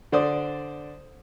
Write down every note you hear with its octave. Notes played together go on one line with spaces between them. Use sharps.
D3 C5 D5 D#6